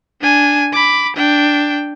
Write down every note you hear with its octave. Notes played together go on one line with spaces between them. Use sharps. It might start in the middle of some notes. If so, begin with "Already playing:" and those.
D4 G#5
B5 D6
D4 G5